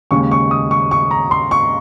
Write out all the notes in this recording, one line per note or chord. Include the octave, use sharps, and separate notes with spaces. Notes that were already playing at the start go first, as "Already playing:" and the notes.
D#2 C#3 G#3 C#6
C#6
D#6
C#6
C#6
A#5
C6
C#6